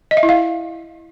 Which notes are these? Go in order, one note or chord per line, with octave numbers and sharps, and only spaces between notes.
D#5
E5
E4
F5